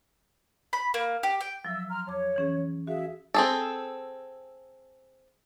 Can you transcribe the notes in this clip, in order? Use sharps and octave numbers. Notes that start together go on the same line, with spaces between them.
B5
A#3
G4
G5
F3 F#3 E5 E6
A#5 C6 F6
F2 C#5 D6
E3 C#4 G#4
F#4 G#4 E5 F5
C4 G#4 A4